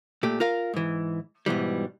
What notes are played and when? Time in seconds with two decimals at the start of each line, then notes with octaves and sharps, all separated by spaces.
0.23 A#2 A3 G4
0.40 F4 A#4 F5
0.74 G#2 E3
1.46 G#2 B2 E3 G3